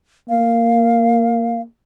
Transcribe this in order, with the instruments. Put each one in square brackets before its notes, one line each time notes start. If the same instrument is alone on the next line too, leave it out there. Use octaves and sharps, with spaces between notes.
[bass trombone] A#3 [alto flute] F5